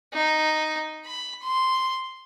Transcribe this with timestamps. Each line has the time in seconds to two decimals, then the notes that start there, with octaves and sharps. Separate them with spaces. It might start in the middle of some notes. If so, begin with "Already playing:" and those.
0.14 D#4
1.06 B5
1.42 C6